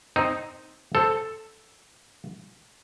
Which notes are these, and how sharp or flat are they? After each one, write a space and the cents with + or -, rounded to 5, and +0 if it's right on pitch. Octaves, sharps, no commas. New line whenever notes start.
C4 +0 D#4 +0
A4 +0 C5 +0